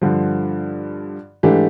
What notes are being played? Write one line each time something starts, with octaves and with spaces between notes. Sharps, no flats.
G2 D3 F3
G#2 E3 A3 D4 G4